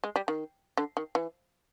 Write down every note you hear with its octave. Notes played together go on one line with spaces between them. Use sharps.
G#3
G3
D#3
D3
D#3
E3